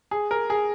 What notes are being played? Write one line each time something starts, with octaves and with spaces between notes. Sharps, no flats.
G#4
A#4
G#4